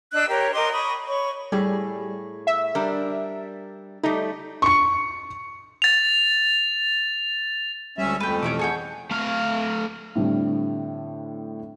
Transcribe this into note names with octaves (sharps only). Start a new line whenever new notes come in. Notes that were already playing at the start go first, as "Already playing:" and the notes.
D4 D#5 E6 F#6
G4 A#4 C#5
A#4 D#5 C6 D6
B5 C#6 D#6
C#5 B5 C#6
A2 G3 G#4
E5
G3 D4 A#4
G3 A3 D#4
C#6 C#7
A6 F7
D2 G3 G#3 C#4 E5
F2 A3 B4 G5
B2 E3 C#4 E4 G4 D6
G#4 C#5 F#5 G#5 A5 G6
A3 F5
A2 D3 G3 C4 D4